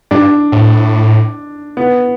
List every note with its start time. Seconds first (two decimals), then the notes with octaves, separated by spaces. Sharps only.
0.11 G2 D4
0.52 A2
1.77 B3